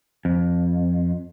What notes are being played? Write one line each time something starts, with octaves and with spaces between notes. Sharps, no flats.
F2